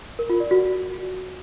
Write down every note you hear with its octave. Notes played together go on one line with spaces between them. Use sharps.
A#4
F4
D5
F#4